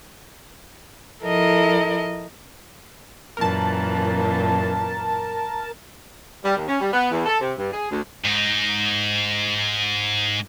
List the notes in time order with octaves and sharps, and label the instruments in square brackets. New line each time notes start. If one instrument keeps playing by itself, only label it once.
[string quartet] F3 E4 A4 A#4 D#5
[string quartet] F#2 A#2 E3 [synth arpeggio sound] A#4 A5
[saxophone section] G3
D#2
C#4
G3
B3
E2
A4
C3
G2
G#4
D2
[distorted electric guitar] G#2 D#4